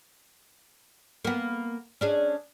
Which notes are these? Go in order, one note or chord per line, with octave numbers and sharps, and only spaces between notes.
A#3 B3
C#4 D4 G#4